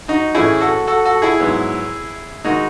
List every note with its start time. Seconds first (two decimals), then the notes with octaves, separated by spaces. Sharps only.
0.08 D#4 F#4
0.35 A2 E3 A3 C#4 E4 G#4
0.61 F#4 A4
0.87 F#4 A4
1.05 F#4 A4
1.22 E4 G#4
1.40 G#2 F#3 B3
2.45 D#3 G#3 D#4 F#4